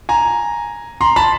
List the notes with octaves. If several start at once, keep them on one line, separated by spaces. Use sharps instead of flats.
G#5 A#5
A#5 C6
A5 B5